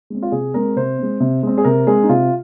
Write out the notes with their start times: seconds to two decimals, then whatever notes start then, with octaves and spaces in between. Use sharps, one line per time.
0.10 G#3 C4
0.23 F4
0.32 C3 G#4
0.54 G#3 C4 A#4
0.76 C3 C5
0.98 G#3 C4
1.20 C3
1.43 G#3 C4
1.58 G#4
1.64 C3 A#4
1.87 G#3 C4 G#4
2.03 D#4
2.09 C3 F4